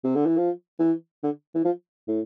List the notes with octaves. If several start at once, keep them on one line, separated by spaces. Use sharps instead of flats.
C3
D3
E3
F3
E3
D3
E3
F3
A2